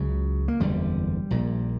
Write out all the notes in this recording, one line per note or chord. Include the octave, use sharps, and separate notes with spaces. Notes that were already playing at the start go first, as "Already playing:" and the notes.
Already playing: C#2 C#3 F#3
A#3
F#1 E2 D3 G3
A#1 A#2